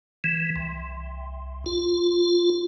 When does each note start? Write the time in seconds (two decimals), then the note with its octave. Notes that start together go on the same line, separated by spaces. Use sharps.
0.24 E3
0.56 C2
1.66 F4